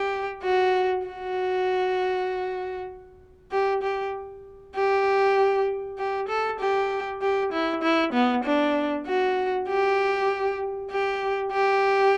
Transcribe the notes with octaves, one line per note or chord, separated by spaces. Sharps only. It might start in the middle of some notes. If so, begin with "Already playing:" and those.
Already playing: G4
F#4
F#4
G4
G4
G4
G4
A4
G4
G4
E4
E4
B3
D4
F#4
G4
G4
G4